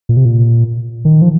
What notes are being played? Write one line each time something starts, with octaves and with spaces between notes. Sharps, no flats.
A#2
C3
A#2
D#3
F3